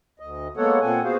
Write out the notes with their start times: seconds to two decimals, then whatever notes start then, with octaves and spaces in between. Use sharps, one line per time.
0.20 D2 D#5
0.57 G#3 A#3 B3 A4 C#5 F#5
0.82 A#2 C4 A4 F#5 G#5
1.04 B3 F#4 G#4 C5 F5